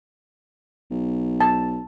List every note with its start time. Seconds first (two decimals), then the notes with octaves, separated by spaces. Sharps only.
0.91 B1
1.41 A5